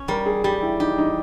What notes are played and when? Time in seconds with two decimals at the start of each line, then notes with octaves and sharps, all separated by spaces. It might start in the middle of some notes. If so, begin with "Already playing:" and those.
Already playing: C#4
0.08 G3 A#4
0.25 G#4
0.44 G3 G4
0.62 E4
0.80 D#4 G4
0.98 D#4